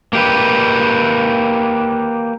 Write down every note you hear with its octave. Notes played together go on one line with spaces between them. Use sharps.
A#3 G4 B4